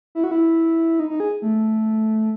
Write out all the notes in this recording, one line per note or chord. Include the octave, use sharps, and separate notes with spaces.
E4
F#4
E4
D#4
D#4
G#4
A3